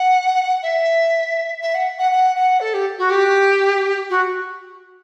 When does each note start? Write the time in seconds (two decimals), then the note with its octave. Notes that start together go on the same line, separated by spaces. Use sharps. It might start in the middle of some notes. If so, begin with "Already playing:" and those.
Already playing: F#5
0.62 E5
1.62 E5
1.74 F#5
1.98 F#5
2.11 F#5
2.35 F#5
2.60 A4
2.73 G4
2.98 F#4
3.10 G4
4.09 F#4